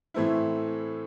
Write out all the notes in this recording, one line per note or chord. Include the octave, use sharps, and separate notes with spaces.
A2 E3 A3 C4 E4